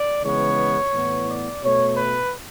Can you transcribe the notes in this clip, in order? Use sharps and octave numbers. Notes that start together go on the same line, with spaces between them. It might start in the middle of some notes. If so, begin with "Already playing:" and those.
Already playing: D5
C#3 E3 G#3 B3 C#5
A2 E3 B3
D5
B2 A3 C#5
B4